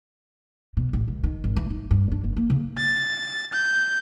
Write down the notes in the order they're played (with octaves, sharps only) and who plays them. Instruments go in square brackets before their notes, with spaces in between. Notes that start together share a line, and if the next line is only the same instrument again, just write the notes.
[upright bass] B2
A1
C#2
D#3
G#1
E3
D#4
G2
D4
F#1
A#3
C#3
[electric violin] A6
G6